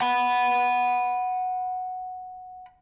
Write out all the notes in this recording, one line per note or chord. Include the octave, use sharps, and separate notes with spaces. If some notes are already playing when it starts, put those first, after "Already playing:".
F#5 B5